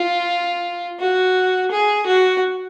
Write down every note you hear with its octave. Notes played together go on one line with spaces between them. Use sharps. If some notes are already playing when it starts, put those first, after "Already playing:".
Already playing: F4
F#4
G#4
F#4